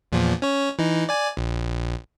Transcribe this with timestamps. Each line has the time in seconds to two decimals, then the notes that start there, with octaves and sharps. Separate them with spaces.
0.12 E2 A#2 F3
0.42 C#4 C#5
0.79 E3 D#4
1.09 D5 G#5
1.37 A#1